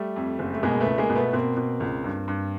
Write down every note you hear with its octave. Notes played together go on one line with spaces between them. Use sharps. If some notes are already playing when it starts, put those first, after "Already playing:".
Already playing: G3 A3
F2
F#1
A3
B2 G#3 A#3
A3 B3
C#2
G#3 A#3
B2
A3 B3
B2 A#3 C4
B2
C#2
G2
G2